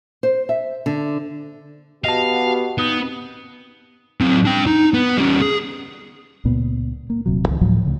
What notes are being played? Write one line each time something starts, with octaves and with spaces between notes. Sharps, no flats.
C5
E5
D3
B3 F#4 G4 D#5 F5 A5
B3 D#4
F#3 C4
D4 G5
D#4
B3
G3 C#4
G#4
C#2 A#2 B3
A#3
D#1 C3 F#3
C#2 E3
D2 A2 F3 F#3
D2 C#3